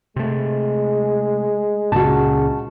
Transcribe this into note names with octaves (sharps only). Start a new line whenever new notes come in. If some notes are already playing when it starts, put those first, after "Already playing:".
C3 G#3 A3
C#2 A#2 C#3 F#4 A5